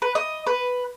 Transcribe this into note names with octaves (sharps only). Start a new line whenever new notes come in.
B4
D#5
B4